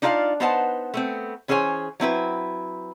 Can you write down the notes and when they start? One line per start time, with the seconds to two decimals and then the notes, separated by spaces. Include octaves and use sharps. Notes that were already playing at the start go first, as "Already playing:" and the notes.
0.02 D4 D#4 F4 D5 E5 F5
0.40 B3 D#4 B4 C5 F#5 A5
0.94 A3 B3 C4
1.48 E3 C#4 G#4 C5 C#5 G#5
2.00 F#3 C4 E4 B4